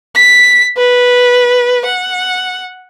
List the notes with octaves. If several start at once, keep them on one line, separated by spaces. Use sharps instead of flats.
B6
B4
F#5